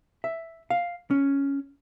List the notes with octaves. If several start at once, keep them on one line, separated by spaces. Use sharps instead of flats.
E5
F5
C#4